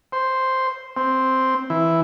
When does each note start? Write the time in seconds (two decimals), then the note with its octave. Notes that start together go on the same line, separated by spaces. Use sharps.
0.12 C5
0.97 C4
1.70 E3